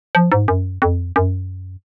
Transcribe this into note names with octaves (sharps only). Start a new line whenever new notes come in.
F3
G#2
F#2
F2
F#2